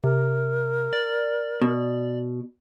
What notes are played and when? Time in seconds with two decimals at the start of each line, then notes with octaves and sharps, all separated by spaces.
0.04 C3 A#4
0.93 D5
1.62 B2